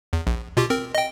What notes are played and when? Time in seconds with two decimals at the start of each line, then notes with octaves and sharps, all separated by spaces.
0.13 E2
0.27 A#1
0.57 B2 F4 G4
0.70 C4 A#4
0.95 D#5 G5